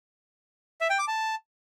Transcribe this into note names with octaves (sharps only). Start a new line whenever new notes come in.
E5
G5
D6
A5